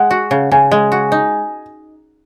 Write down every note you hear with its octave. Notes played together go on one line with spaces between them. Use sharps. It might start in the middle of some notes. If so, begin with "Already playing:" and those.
Already playing: G#3 F#5
F#4
C#3
C#3 G#5
G#3
F#4
D#4